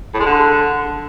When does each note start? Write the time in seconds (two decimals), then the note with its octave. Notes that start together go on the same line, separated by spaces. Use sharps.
0.14 A2
0.20 G#3
0.26 D3